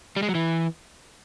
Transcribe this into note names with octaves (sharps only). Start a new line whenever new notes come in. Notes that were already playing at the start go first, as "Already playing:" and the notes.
G3
G#3
F#3
E3